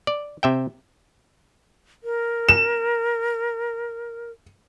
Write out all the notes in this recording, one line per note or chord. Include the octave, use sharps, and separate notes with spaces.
D5
C3 E5 G5
A#4
E7